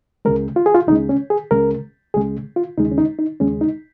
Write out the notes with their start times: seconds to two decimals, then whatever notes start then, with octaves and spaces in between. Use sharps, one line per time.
0.25 C#2 C#3 G#3 A#4
0.56 F4
0.66 G#4
0.74 F4
0.88 C#2 C#3 G#3 D#4
1.09 C#4
1.30 G#4
1.51 C#2 C#3 G#3 A#4
2.14 C#2 C#3 G#3 G#4
2.56 F4
2.78 D#2 C#3 G#3 D#4
2.91 C#4
2.98 D#4
3.19 D#4
3.40 D#2 C#3 G#3 C#4
3.61 D#4